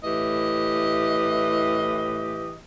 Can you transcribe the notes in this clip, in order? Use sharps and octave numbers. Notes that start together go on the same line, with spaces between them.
A2 E3 G4 D#5